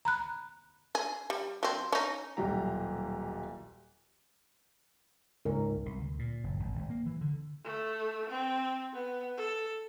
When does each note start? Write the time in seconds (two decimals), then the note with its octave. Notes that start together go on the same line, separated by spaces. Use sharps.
0.05 A#5 B5 F#6
0.95 G#4
1.30 G3
1.63 F#3 C4
1.92 C#4 D#4
2.37 D#1 B1 G3 G4 A#5
5.45 C#2 G#2 A#4
5.86 C2
5.98 D2
6.19 A#2
6.44 F#1
6.59 G#1
6.75 G#1
6.90 A#3
7.06 E3
7.21 D3
7.65 A3
8.30 C4
8.93 B3
9.37 A4